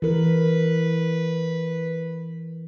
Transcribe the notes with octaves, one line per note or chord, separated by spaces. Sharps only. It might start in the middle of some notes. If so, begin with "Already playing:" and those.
E3 A#4 B4